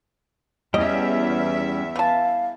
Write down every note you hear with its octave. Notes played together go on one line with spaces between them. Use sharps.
E2 G3 B3 C#4 D#5 E5
E3 F5 A5